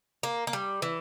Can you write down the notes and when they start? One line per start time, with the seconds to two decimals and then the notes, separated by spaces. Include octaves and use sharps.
0.23 A#3
0.47 A#3
0.53 G3
0.82 E3